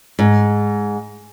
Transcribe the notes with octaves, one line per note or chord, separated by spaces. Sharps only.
G#2